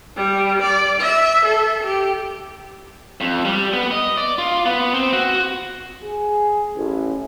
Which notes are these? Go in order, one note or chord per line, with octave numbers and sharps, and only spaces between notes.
G3
D5
E5
A4
G4
F2
G3
B3
D#5
D5
F4
B3
C4
F#4
G#4
A1